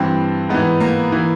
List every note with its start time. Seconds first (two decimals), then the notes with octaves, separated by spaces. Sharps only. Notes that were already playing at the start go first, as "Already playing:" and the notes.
Already playing: G2 E3 C4
0.49 G#2 E3 B3
0.80 A#3
1.12 E3